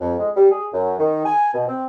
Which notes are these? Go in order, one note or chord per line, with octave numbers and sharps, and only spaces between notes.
F2
G#3
G3
G#4
F#2
D#3
G#5
B2
C4